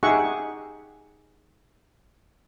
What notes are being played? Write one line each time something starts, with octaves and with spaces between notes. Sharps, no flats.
D#4 G4 G#4 E5 F#5 C#6